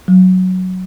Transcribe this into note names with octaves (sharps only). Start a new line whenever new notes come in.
F#3